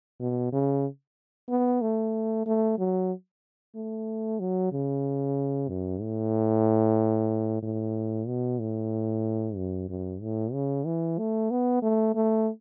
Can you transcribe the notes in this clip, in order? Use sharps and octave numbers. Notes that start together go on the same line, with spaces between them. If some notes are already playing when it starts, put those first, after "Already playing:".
B2
C#3
B3
A3
A3
F#3
A3
F#3
C#3
F#2
A2
A2
B2
A2
F#2
F#2
A2
C#3
E3
A3
B3
A3
A3